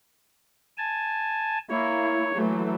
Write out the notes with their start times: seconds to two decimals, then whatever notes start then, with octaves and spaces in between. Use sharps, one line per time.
0.78 G#5 A5
1.70 A#3 E4 C#5
2.35 E3 F#3 A3